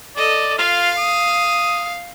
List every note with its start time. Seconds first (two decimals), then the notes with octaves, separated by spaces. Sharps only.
0.16 A4 D5 D#5
0.58 F4 F5
0.98 D#6